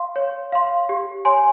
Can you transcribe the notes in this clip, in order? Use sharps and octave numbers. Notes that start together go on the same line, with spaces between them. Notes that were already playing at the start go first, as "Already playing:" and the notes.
Already playing: F5 C6
C#5
F5 C6
G4
C#5 G#5 C6